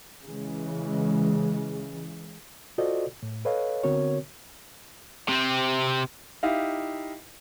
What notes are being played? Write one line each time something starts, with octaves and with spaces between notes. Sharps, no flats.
C#3 E3 G#3
F4 F#4 A4 C5 D5 D#5
A2
A4 B4 C#5 D#5 F5
D3 B3 C4 F#4 A#4 C#5
C3 C4
D#4 E4 G4 F5